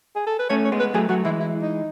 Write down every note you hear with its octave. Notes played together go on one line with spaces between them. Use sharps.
G#4
A4
B4
A3 C#4 C#5
C#5
G#3 B3
B4
F#3 A3 G#4
F#3 A3 F#4
E3 G#3 E4
E4
D#4